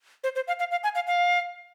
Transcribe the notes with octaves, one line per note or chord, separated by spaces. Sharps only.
C5
C5
F5
F5
F5
G#5
F5
F5